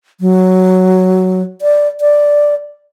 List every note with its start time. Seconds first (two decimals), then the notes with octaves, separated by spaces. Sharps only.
0.21 F#3
1.62 D5
2.01 D5